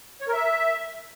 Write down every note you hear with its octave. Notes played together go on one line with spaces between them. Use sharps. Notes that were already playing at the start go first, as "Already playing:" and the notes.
C#5
A#4
E5